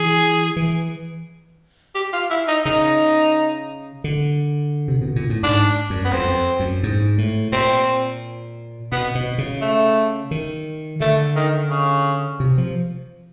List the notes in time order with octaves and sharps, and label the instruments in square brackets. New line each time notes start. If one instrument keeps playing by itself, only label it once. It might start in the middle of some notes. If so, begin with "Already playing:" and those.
Already playing: [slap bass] E3 [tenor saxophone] G#4
[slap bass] E3
[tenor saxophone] G4
F4
E4
D#4
[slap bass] C#3 [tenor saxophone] D#4
[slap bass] D3
C3
B2
A#2
A2
[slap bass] G#2 [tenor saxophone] D4
[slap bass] F#2
[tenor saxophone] B3
[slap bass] F2 [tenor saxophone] C4
[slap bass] F#2
G#2
A2
[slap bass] A#2 [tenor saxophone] C4
[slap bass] B2 [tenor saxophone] B3
[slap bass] B2
C#3
[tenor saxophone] A3
[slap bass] D#3
[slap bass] D3 [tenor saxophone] A3
[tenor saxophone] D#3
C#3
[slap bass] C3
F3